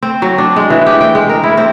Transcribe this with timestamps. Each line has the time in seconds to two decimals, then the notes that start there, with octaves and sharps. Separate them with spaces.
0.03 C4
0.22 F#3
0.38 D4
0.56 G#3
0.70 E3
0.87 G4
1.01 G5
1.15 G#3
1.29 A#4
1.43 E4
1.57 C4